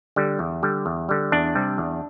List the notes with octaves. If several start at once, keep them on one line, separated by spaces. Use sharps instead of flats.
D3 G3
E2
D3 G3
E2
D3 G3
E2 D4
C3 G3
E2